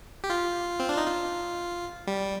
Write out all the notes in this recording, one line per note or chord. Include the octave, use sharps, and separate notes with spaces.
G4
F4
C4
D4
D#4
F4
G3